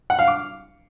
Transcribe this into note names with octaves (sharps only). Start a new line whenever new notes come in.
F#5
F5
D6